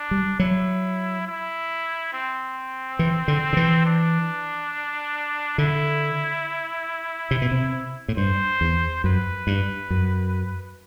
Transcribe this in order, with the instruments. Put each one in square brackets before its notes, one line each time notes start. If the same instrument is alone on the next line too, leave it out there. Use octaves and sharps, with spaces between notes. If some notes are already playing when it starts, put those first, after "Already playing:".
Already playing: [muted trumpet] D4
[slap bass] G3
[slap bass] F#3 [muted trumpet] E4
[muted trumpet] E4
C4
[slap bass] E3
D3
D3
E3
[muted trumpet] D4
[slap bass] D3 [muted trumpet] E4
[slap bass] C3
B2
C3
A2
[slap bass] G2 [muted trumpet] C5
[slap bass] E2
[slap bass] F#2 [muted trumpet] B4
[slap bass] G2
F#2